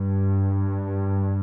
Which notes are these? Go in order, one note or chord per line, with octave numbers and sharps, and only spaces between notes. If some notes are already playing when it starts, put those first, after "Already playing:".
Already playing: G2